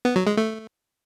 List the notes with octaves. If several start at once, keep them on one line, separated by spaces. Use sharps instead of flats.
B3
F#3
G#3
A3